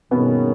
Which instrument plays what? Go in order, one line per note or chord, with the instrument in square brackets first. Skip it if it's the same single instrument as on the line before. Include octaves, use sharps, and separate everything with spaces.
[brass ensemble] G2 D#3 A#3 C#4 G#4 [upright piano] B2 B3